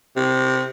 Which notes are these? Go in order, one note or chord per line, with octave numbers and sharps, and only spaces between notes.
C3